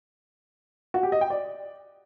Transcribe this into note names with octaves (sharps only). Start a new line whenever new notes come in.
F#4
G4
D#5
G5
D5